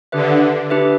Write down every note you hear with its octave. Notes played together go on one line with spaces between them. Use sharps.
D3 D4 G4 B4 E5
D4 G4 B4 E5